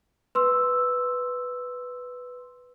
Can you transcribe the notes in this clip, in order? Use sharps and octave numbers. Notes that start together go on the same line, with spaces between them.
B4 C6 E6